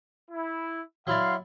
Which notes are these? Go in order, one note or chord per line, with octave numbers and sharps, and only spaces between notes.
E4
F#3 E4 D5 F5 C6